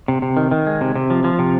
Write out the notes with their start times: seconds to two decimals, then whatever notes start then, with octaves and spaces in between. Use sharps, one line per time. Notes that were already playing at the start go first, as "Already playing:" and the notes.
0.08 C3
0.22 C3
0.37 D#3
0.51 D#3
0.67 G#3
0.81 C3
0.96 C3
1.10 F3
1.24 F3
1.39 C3